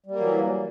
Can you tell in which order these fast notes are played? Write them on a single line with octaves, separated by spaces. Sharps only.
G3 A#3 F#3 E3